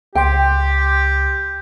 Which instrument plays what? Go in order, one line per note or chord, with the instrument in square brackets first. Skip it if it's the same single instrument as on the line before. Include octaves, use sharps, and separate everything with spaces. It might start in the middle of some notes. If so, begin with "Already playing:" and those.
[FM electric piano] C#2 C6 [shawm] G4 [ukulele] G5